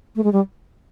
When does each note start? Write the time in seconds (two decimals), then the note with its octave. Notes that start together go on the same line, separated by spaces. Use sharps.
0.16 A3
0.24 G#3
0.33 G3